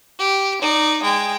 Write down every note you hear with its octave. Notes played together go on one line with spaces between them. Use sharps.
G4
D#4 D5
G#3 G5